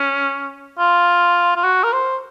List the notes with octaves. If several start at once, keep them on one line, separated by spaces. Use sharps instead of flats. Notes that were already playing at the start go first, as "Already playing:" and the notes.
Already playing: C#4
F4
F4
F#4
A#4
C5